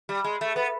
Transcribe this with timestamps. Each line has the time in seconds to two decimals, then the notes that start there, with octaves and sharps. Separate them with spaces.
0.09 G3
0.24 G#3
0.41 A3
0.56 B3